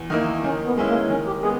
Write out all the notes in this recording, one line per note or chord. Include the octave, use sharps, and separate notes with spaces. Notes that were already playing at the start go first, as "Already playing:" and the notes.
Already playing: E2
D#3 A#3 D#4 E4
D#3 C#4
B3
G#3 C#4 E4
A#3
D#3 C#4
G4
G#3 B3 G#4